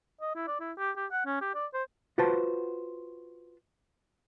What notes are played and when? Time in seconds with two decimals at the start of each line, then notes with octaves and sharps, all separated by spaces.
0.21 D#5
0.35 E4
0.47 D5
0.60 E4
0.78 G4
0.96 G4
1.12 F#5
1.26 C#4
1.41 G4
1.55 D5
1.73 C5
2.18 F4 F#4 B4 C5 F#5 A5